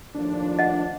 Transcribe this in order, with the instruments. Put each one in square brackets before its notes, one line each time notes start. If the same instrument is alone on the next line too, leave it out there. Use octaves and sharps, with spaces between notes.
[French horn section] D#2 A2 F3 [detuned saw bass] D4
[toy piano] D#5 F#5